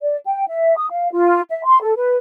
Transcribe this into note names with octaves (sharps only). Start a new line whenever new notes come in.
D5
G5
E5
D#6
F5
F4
E5
C6
A4
B4